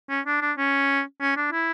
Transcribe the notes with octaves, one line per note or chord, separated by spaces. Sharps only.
C#4
D4
D4
C#4
C#4
D4
E4